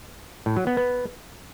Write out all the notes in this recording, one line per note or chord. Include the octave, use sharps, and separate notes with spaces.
A2
F#3
B3
B3